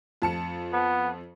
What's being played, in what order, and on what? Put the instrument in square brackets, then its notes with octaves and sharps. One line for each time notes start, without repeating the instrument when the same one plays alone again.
[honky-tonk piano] F2 A5 C#7
[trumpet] B3